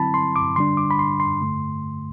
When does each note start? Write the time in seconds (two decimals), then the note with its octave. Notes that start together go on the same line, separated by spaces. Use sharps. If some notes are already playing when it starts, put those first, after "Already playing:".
Already playing: D3 F#3 C4 E4 A5 B5
0.14 C6
0.36 D6
0.56 D3 G3 D4 C6
0.77 D6
0.90 B5
0.99 C6
1.20 C6
1.41 G2 D3 A3